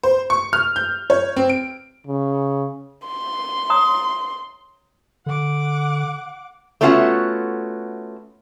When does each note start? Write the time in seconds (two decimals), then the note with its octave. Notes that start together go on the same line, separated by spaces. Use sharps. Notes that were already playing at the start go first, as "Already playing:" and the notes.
0.03 C5
0.30 C#6
0.53 F6
0.76 G6
1.10 C#5
1.36 C4
1.49 D7
2.07 C#3
3.08 C6
3.70 C#5 A#5 D#6
5.26 D3 F#5 D6
6.81 A3 B3 C#4 F4 F#4 F#5